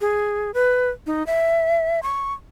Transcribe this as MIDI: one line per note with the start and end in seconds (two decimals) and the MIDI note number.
0.01 0.51 68
0.54 0.89 71
1.07 1.25 63
1.27 2.00 76
2.03 2.33 85